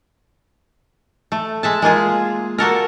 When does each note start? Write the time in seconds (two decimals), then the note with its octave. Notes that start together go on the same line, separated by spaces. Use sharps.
1.32 A3
1.63 G#3 E5 A5
1.82 G#3 A#3 F4 G#4
2.58 A#3 F#4 A4 A#4